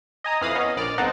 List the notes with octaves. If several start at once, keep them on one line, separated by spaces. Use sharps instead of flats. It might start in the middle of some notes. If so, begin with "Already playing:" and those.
D#5 G#5 A#5 D#6
F2 E3 F5 B5 D#6 A#6
B3 C#4 D#5
A#1 D5 F6
G1 C4 D#4 F#5 A5 A6